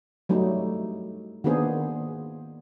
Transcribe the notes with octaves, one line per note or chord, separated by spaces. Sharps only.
F#3 G3 A3 D#4
D#3 A#3 B3 D4 G#4 C5